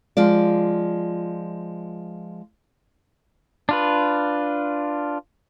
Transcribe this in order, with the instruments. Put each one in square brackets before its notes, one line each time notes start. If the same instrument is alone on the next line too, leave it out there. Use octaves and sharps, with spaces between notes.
[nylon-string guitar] F3 G#3 F4 D5
[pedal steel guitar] D4 F4 B4